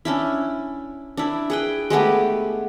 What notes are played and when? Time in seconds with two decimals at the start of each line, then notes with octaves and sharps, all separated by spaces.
0.05 C#4 D4 E4
1.17 D4 E4
1.50 G#4 B4 G5
1.90 G#3 A3 B3 G4